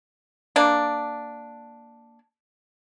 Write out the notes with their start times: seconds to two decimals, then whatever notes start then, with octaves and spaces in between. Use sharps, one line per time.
0.56 A#3 D4